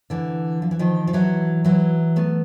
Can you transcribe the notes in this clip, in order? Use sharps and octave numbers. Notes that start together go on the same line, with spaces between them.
D3 E3
F3
E3
D#3 F3
F3
E3 F#3
E3 F#3
A3 B3